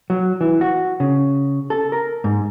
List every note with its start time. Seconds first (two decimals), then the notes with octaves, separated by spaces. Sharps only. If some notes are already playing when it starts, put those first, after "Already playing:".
0.10 F#3
0.41 E3
0.61 F#4
1.00 C#3
1.70 A4
1.92 A#4
2.24 G#2